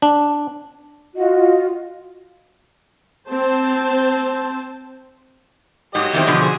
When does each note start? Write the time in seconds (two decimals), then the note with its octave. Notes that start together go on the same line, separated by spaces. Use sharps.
0.02 D4
1.15 F4 F#4 D#5
3.28 C4 C5 A5
5.95 G#2 F#3 G4 D#5
6.13 E2 D#3 C4
6.27 B2 D3 F3
6.41 F#4 G#4